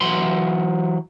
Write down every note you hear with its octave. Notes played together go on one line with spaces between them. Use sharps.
E3 F#3 B5 C6